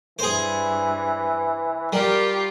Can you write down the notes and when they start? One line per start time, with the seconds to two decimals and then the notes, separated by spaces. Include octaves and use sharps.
0.19 G2 E3 G#4 C5
1.93 G3 F4 G4 A#4